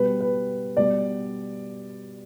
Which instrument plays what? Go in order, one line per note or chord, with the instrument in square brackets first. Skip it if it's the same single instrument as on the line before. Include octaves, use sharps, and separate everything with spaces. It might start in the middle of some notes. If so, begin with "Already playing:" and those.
Already playing: [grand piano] B2 G3 B4
B4
B2 G3 D5